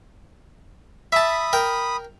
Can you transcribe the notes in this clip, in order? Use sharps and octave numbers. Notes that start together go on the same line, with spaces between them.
E5 A5 B5 D#6
A#4 G5